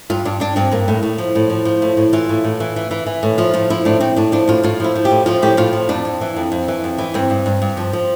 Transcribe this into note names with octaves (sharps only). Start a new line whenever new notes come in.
G2 F4
G2 D4
G2 D4
G2 C4
G2 A#3
A2
A2
F3
A2
F3
F3
A2
A2
E3 F4
A2
A2
E3
E3
E3
E3
A2
F3 F4
A2 F4
F3 E4
A2 D4
A2 C4
A2 D4
F3 D4
A2 F4
A2 F4
F3 E4
F3
G4
A2
F3 F4
A2 G4
A2 F4
F3
F2 D4
F2
E3
F2
F2
E3
F2
E3
G2 C4
G2
G2
G2
F3
F3